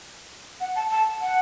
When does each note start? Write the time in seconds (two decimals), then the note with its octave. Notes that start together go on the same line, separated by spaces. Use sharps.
0.60 F#5
0.76 A5
0.91 A5
1.21 F#5